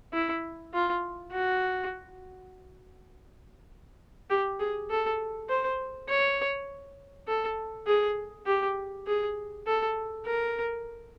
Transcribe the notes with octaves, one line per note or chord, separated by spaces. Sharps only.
E4
F4
F#4
G4
G#4
A4
C5
C#5
A4
G#4
G4
G#4
A4
A#4